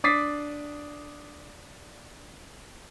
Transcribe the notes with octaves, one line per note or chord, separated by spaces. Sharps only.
D4 D6 D#6 A6 B6 C7